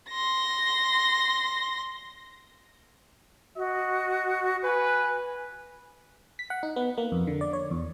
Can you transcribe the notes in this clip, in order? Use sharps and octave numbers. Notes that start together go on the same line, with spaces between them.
C6 A#6
F#4 D#5
B4 G#5
B6
F#5
D#4
B3
A#3
F2
D3
D5
C#5
E2